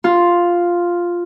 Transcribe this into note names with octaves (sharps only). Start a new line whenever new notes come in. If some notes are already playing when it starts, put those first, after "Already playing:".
F4